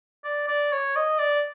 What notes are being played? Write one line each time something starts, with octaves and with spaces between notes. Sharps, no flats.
D5
D5
C#5
D#5
D5